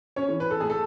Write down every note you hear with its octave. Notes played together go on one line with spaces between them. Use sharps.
C#4 C#5
E3
B4
A4
A3 G#4
A4